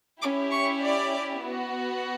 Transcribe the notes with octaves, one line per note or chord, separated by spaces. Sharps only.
C#4 E4 G4 D6
C#6
D5
B3 F#4